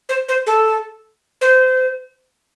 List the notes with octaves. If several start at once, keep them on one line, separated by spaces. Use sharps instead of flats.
C5
C5
A4
C5